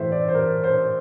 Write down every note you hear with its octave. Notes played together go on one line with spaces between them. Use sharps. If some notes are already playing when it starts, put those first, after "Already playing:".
Already playing: A2 E3 A3 C5 E5
D5
C5
A#4
C5